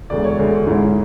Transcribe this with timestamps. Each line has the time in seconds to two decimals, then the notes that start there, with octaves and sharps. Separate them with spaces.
0.10 E1 D2 D3 G#3 D5
0.24 C#5
0.39 E1 D2 D3 G#3
0.66 G#2 G#3 C#4 E4